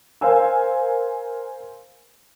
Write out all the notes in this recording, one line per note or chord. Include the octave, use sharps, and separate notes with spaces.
A#4 C5 F5 G#5 E6